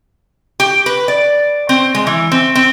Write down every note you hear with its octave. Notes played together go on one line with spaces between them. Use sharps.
G4
B4
D5
C4
G#3
E3
C4
C4